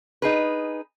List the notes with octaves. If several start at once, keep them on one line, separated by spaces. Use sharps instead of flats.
D#4 G#4 B4